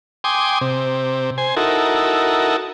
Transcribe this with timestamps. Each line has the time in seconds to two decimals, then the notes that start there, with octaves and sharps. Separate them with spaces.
0.24 G5 G#5 C6 D6 D#6
0.61 C3
1.38 C5 G#5
1.56 D#4 E4 F#4 A4 A#4